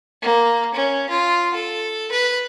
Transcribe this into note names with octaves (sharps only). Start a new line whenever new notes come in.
A#3
C#4
F4
A4
B4